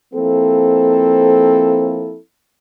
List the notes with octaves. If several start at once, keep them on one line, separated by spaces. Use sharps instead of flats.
F3 A#3 C4 E4 A4